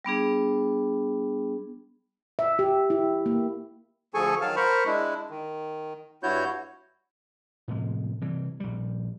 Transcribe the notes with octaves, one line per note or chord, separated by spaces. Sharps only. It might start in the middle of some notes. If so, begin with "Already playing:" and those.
G3 B3 D4 G#4
E5
G4
E4
A#3
D2 F3 G#4 A4 G#5 C#6
D#3 F#3 F5 A5 F6
A#4 C5 B5 C#6
G#3 D4 E4
D#3
G2 E4 F#4 C#5 G6
A2 C3 F3 G#3
C3 E3 G3
A#1 G3